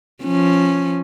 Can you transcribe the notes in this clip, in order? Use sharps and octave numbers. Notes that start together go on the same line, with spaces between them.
F3 C#4